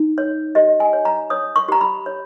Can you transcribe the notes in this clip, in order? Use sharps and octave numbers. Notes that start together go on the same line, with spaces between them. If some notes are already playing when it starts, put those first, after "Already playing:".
Already playing: D#4
C#5
G4 D#5
G#5
C#5
A#5
C#5 D#6
C#6
G4 A#5
B5
C#5